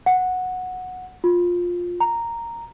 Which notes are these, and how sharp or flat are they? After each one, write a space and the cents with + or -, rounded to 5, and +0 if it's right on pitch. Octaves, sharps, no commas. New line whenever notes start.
F#5 -10
F4 +15
A#5 -5